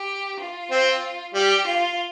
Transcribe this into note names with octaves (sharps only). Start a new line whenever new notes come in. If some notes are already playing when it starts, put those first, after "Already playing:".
Already playing: G4
F4
C4
G3 G4
F4